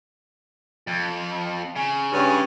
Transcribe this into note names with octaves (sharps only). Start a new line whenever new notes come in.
F2
C#3
G2 C#4